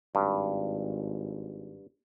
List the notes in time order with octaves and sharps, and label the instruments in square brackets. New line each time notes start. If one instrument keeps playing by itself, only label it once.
[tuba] G#1 [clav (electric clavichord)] G2